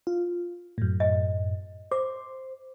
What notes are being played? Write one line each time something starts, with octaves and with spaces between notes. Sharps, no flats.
F4
F#2 A2
D#5
C5 D6